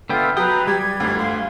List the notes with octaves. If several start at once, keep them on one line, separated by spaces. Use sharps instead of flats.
D3 B3 F4 A4 E5 G5
F#3 B4 G5 A#5 D#6
G3 G4 G#6
G1 D2
F5 C6